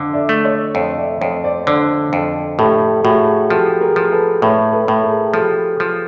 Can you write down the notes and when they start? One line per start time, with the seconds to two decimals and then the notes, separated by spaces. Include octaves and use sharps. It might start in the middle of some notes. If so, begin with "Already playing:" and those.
Already playing: F2 D3 A4
0.13 D5 E5
0.29 A3
0.44 C#5 D#5
0.74 F2 C#5 D#5
0.98 D5 E5
1.20 F2 C#5 D#5
1.44 C5 D5
1.67 D3 C5 D5
2.13 F2
2.59 A2 G4 A4
3.04 A2 F#4 G#4
3.50 F3 G4 A4
3.80 G#4 A#4
3.96 F3
4.12 A4 B4
4.42 A2 B4 C#5
4.72 A4 B4
4.88 A2
5.03 G#4 A#4
5.33 F3 G4 A4
5.80 F3